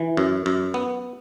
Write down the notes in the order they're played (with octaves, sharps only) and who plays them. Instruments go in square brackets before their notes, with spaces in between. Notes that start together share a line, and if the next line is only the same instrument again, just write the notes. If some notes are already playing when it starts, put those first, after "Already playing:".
Already playing: [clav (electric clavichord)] E3
F#2
F#2
B3